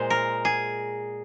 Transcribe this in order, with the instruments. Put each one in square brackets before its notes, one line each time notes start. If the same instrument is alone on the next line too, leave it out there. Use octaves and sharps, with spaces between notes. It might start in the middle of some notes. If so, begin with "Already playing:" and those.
Already playing: [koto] A#2 G#3 C5
A#4
G#4